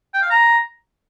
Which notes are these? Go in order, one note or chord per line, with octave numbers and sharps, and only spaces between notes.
G5
F5
A#5